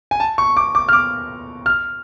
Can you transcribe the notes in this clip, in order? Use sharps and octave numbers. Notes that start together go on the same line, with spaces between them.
G#5
A5
C#6
D6
D6
F6
D6
F6